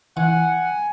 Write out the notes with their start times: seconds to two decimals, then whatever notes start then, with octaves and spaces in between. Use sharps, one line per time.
0.17 E3 F#5 G#5